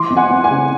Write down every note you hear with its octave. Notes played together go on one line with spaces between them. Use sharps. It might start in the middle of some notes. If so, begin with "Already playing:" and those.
Already playing: E3 C6 D6
F2
F#5 G#5
F2
F#5 G#5
C#3